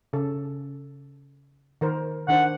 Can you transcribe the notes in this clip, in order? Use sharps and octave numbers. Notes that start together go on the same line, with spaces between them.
C#3 A4
D#3 A#4 C5
D#3 D4 C5 F#5